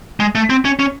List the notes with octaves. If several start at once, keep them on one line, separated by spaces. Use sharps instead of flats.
G#3
A3
C4
C#4
C#4